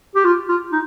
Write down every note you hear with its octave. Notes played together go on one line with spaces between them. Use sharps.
G4
F4
F4
D#4